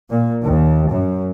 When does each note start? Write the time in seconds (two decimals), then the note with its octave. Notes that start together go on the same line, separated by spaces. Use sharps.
0.10 A#2
0.44 D#2
0.91 F#2